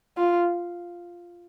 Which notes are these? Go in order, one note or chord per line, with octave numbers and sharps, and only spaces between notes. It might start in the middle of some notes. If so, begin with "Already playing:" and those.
F4